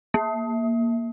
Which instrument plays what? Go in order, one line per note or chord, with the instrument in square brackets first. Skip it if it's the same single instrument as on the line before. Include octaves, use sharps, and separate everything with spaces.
[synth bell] A#3